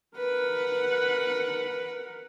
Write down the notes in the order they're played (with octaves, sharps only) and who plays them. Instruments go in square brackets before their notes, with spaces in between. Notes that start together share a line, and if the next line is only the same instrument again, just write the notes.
[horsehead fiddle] A#4 F#5 [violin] B4